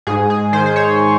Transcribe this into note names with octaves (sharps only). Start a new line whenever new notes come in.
G#2 G#4
G#4
D#3 C5
C5
C#5